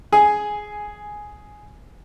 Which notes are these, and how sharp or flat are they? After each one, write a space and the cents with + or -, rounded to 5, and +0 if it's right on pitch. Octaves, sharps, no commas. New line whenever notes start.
G#4 +5 G#5 +0